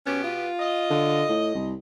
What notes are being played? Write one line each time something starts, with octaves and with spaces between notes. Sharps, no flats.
B2 B3 C#4 G4
F4
D#5
D3
A2
C2